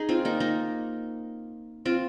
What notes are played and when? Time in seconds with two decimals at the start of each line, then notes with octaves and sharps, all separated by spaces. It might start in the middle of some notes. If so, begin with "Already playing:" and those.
Already playing: D#4 G#4
0.09 C4 F4
0.25 A#3 D#4
0.40 A#3 D#4
1.85 C4 F4